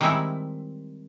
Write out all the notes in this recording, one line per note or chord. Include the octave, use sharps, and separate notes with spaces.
D#3 G3 G#3 C4 D#4 E4